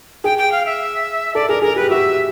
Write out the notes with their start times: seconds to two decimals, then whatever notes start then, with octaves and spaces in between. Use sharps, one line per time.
0.24 G#4 G5
0.38 G5
0.52 F5
0.66 E5
1.35 A4 D5
1.49 G#4 A#4
1.62 G#4 A#4
1.76 G4 B4
1.90 F#4 E5